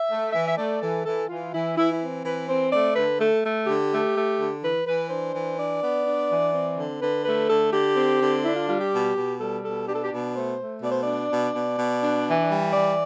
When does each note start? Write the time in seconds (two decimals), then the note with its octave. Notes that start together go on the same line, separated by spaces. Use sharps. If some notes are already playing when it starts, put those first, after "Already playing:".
Already playing: E5
0.09 A3
0.33 E3 E5
0.47 E5
0.57 A3 D5
0.81 E3 A4
1.04 E3 A4
1.28 E3 F4
1.52 E3 E4
1.76 E3 E4
1.92 E4
2.00 C4
2.23 E3 B4
2.48 C4 C5
2.71 A3 D5
2.95 D3 B4
3.19 A3 A4
3.43 A3
3.67 D3 G4
3.90 A3
4.15 A3
4.38 D3
4.62 E3 B4
4.86 E3 B4
5.10 D4 C5
5.34 E3
5.58 D4 D5
5.82 B3
6.05 D4
6.29 E3
6.53 C4
6.77 D3
7.00 D3 B4
7.24 A3 B4
7.48 D3 A4
7.72 D3 G4
7.96 C4
8.20 D3
8.44 D4 E4
8.55 F4
8.67 G3 F4
8.80 G4
8.91 B2
9.15 B2
9.39 G3 A4
9.63 B2 A4
9.86 D4 G4
9.94 A4
10.03 G4
10.11 B2
10.34 A3 C5
10.58 A3
10.82 B2 D5
10.91 C5
11.02 D4 D5
11.30 B2
11.53 B2
11.77 B2
12.01 D4
12.25 E3
12.49 G3
12.73 E3 D5